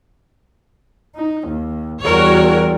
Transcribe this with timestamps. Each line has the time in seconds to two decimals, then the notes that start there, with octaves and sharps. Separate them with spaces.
1.16 D#4
1.48 D#2
2.03 E2 G3 F#4 A#4 C#5